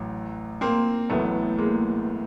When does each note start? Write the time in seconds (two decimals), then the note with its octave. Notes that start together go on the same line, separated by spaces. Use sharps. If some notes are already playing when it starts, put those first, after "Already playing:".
Already playing: A1 A2 F#3
0.61 A#3 C4
1.09 A1 A2 F#3 A3 B3
1.58 G#3 A#3